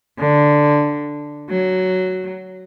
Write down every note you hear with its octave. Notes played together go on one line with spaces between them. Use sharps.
D3
F#3